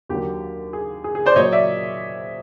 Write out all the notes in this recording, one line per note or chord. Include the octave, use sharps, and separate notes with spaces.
D#2 D3 F#3 A#3 G4
G#4
G#4
G#4
C5 D5
A#2 F#3 A#3 C#5 D#5
D5 E5